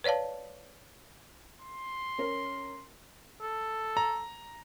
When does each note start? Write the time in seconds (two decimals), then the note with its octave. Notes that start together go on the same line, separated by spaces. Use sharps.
0.04 B4 C#5 D5 F5 A5
1.61 C6
2.18 C#4 A#4
3.42 A4
3.97 A#5